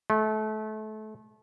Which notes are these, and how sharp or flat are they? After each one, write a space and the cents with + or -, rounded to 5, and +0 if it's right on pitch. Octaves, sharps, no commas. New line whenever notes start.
A3 -30